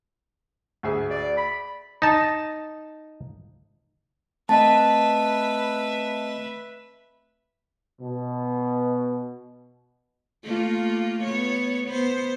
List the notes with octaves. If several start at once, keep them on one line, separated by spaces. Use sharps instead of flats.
D2 G#4 E5
D5
B5
D#4 A5
A3 C4 B4 D#5 E5 A5
B2
A3 A#3 F4
B3 C#5
B3 C5